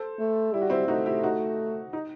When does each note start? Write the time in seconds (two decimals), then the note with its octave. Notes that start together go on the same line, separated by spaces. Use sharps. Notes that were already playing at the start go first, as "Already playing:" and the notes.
Already playing: A4 C5
0.19 A3
0.54 G3 E4
0.62 F#4
0.70 C4 E4
0.88 A3 D#4 F#4
1.06 E4 G4
1.23 D#4 F#4
1.93 D#4